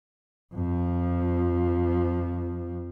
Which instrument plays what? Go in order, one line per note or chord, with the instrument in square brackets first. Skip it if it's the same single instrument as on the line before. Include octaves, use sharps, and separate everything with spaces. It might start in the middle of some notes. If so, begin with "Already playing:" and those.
[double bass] F2 F3